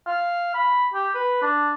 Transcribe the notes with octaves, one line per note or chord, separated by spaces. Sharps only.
F5
B5
G4
B4
D4